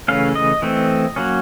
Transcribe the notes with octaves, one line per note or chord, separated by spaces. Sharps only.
C#3 E3 A3 C#4 F5
D#5
E3 A3 C4
F#3 A#3 C#4